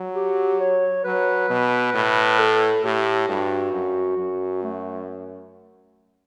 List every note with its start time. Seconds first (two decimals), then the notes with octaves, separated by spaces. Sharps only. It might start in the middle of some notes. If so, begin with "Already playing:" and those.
Already playing: F#3
0.15 G4
0.60 C#5
1.04 F#3 B4
1.50 B2
1.94 A2
2.39 A4
2.84 A2 G4
3.29 G2 F#4
3.73 F#2
4.18 F#2
4.63 A3